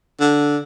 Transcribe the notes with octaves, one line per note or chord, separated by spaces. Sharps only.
D3